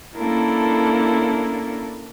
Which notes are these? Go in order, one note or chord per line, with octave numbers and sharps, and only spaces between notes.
A#3 C#4 D4 E4 A4 A#4